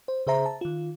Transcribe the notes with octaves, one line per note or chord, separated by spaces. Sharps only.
C5
C#3 G#4 C5 E5 A#5
A5
D#3 F4